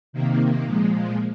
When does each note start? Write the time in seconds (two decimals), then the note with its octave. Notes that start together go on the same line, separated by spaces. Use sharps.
0.13 C3 D#3 A#3
0.64 A#2 F3 G#3